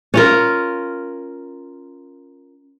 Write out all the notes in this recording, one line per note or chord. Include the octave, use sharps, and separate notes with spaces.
C#4 F4 A#4